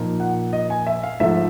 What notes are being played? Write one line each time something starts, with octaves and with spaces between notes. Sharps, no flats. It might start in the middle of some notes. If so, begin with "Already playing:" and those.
Already playing: A#2 F3 A#3 D#4
F#5
D#5
G#5
E5
F5
G#2 F3 A3 E5